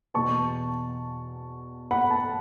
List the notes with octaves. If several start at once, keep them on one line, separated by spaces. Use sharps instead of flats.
E2 B2 B3 A5 C#6
F#5 B5
A5